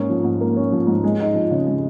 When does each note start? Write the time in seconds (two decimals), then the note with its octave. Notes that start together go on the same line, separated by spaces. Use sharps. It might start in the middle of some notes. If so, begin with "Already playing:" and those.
Already playing: G#2 A#3 C#4
0.09 F3
0.24 G#2
0.41 A#3
0.56 C#4
0.72 F3
0.87 G#2
1.04 G#3
1.20 D#4
1.34 F3
1.51 C#3
1.67 G#3